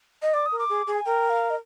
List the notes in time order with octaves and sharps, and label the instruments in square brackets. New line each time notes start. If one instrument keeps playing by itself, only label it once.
[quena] D#5
[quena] D5 [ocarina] D6
[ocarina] D#6
[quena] A#4
[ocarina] D6
[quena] G#4
G#4
[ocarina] G#5
[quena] A#4 [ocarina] G5
[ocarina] F5
D#5